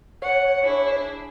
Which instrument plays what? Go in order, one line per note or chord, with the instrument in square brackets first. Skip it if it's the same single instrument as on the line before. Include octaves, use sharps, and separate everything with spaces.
[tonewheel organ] C#5 [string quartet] F#5
[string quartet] D4 E4 G#4